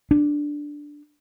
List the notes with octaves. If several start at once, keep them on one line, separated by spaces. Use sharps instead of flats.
D4